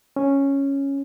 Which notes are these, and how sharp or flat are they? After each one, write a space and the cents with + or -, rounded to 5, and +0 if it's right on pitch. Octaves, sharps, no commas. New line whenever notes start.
C#4 -5